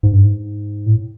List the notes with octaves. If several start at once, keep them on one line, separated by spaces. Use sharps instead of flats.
G#2
G2
G#2
A2